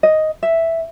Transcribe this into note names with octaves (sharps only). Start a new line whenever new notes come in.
D#5
E5